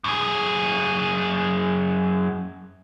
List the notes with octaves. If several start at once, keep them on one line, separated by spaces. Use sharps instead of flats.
F#2 G#4